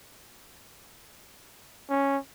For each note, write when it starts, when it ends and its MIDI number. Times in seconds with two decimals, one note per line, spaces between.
1.90 2.17 61